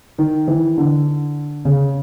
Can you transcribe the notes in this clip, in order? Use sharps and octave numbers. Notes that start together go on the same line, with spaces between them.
D#3
E3
D3
C#3